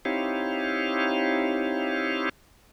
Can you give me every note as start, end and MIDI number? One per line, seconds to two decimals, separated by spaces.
0.05 2.29 60
0.05 2.29 63
0.05 2.29 64
0.05 2.29 67
0.05 2.29 73
0.05 2.29 77